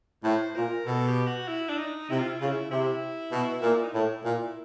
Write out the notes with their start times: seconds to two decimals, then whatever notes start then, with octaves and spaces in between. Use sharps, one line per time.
0.24 A2 C5
0.55 A#2 A#4
0.87 B2 A4
1.07 G4
1.27 F#4
1.48 E4
1.69 D4
1.78 D#4
2.09 C3 E4
2.19 F4
2.30 E4
2.39 C#3 F4
2.49 E4
2.71 C3 E4
3.32 B2
3.62 A#2
3.83 D#4
3.94 A2 E4
4.24 A#2